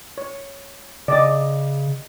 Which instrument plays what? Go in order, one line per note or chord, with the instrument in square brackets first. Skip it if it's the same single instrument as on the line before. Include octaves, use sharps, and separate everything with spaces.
[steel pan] C#5
[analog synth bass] C#3 [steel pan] D5 D#5